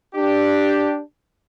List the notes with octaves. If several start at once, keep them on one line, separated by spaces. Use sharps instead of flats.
D4 G4